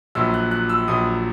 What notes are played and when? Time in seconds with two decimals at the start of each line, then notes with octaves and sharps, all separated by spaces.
0.15 A#1 A#2 F#3 E6
0.34 F#6
0.51 F#6
0.69 E6
0.88 A#1 A#2 F#3 D#6